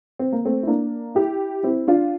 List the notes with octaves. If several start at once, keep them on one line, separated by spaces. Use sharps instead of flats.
C4
A#3
A3 C4
E4
A#3 D4
E4 G4
C4 E4
D4 F4